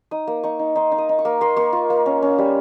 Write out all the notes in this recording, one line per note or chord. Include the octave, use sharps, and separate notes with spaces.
D#4 D#6
A#3
D#4 C#6
D#4
D#4 C6
D#4
D#6
D#4
C#6
A#3
A#3 C6
A#3 C#6
F4
A#3
C#4
C#4
G3